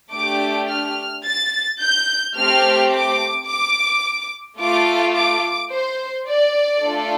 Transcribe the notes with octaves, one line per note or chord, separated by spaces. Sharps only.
A3 D4 G4 D6
F6
A6
G6
A3 C4 G4 F6
D6
D6
A3 F4 A4 D6
D6
C5
D5
A3 D4 F4 A4